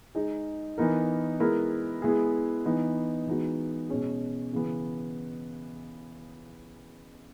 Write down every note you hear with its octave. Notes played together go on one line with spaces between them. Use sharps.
G#3 D#4 G#4
E3 B3 D#4 A#4
G#3 B3 E4 A#4
G#3 B3 E4 G#4
E3 B3 D#4
E3 G#3 B3 D#4 F#4
B2 G#3 C#4 G#4
C#3 E3 B3